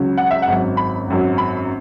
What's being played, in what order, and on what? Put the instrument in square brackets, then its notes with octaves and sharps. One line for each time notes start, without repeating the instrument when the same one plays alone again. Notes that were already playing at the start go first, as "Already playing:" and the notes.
Already playing: [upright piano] C#2 C#3 F#3
F#5
E5
F#5
G#1 F#2 F#3
B5
G#1 F#2 F#3
B5